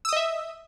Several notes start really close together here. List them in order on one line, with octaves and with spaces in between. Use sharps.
E6 D#6 D#5 E5